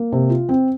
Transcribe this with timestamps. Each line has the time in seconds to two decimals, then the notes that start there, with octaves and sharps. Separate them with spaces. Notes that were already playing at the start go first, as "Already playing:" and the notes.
Already playing: A#3
0.12 C3
0.30 F4
0.49 C4